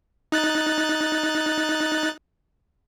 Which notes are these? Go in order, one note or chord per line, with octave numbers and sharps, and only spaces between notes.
D#4 F#6 A6